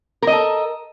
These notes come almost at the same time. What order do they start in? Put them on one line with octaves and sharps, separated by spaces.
A#4 D#5 A4